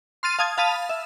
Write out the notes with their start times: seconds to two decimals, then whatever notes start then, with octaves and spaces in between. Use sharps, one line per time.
0.23 C6 F6 A6 D#7
0.39 F5 A5 D#6 G#6
0.58 F5 A5 B5 D#6 F6 D#7
0.89 E5